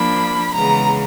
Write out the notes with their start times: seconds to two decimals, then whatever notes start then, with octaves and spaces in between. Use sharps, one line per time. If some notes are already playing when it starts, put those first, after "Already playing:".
Already playing: F3 A#3 D4 B5
0.53 C#3 E3 G#3 B3 A#5